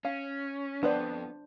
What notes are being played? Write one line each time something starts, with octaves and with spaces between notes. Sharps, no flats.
C#4 F5
F2 B3 D4 B4 C5 D5